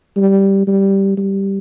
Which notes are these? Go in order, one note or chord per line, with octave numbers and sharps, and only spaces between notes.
G3
G3
G3